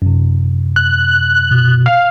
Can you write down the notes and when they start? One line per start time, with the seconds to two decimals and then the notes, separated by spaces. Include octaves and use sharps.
0.02 F#2 C3
0.76 F#6
1.51 B2
1.86 F5 F6